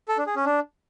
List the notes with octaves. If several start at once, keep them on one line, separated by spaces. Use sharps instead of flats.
A4
D4
G#4
C#4
D4